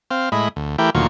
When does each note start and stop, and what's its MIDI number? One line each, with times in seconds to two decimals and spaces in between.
0.11 0.29 60
0.11 0.29 77
0.32 0.49 45
0.32 0.49 56
0.32 0.49 64
0.32 0.49 75
0.32 0.49 83
0.56 0.77 38
0.78 0.90 52
0.78 0.90 57
0.78 0.90 64
0.78 0.90 67
0.78 0.90 70
0.78 0.90 79
0.95 1.07 38
0.95 1.07 46
0.95 1.07 51
0.95 1.07 54
0.95 1.07 65
0.95 1.07 85